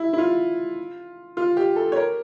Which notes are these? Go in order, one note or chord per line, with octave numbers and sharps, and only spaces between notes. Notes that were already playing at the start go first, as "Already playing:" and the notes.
Already playing: E4
E4
F4
F4
G4
A4
C#5
A#4